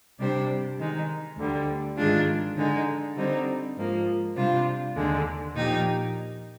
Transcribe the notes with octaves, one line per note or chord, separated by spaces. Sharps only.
C3 G3 D4 G4 C5
D#3 G#3 D#4
D2 D3 G3
G#2 D#3 G#3 D4 F4
D3 G#3 D#4
D3 G3 C4 D#4
G#2 F3 A#3
C3 G3 D4 F4 C5
D#2 D3 G#3 D4
A#2 F3 A#3 D#4 G4